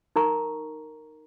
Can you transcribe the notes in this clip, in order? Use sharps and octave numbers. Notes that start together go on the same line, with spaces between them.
D#4 A#4 A#5 C#6